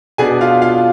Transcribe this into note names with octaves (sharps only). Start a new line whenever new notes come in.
B2 B3 D4 G#4 G#5
F4 F5
F4 F5